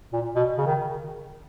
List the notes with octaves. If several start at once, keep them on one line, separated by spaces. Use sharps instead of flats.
A#2
B2
C#3
D#3